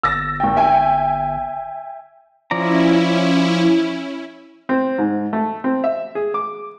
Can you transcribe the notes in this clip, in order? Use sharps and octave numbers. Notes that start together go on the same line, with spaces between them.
G1 E6 A6 A#6
G#1 G5
E5 G5 G#5
F3 C#4 E4 D5 A#5
C4
G#2
A3
C4
E5
G#4
D6